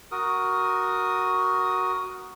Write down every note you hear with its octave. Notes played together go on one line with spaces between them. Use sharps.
F#4 A#4 D#6